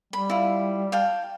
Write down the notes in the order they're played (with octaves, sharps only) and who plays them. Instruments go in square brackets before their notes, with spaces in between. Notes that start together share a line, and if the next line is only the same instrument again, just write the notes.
[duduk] G3 [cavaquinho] B5
[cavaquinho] E4 F4
F5 G5 A5